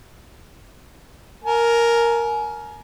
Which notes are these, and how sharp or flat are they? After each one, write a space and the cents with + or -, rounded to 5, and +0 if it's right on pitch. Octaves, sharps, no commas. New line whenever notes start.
A#4 +0 G#5 +30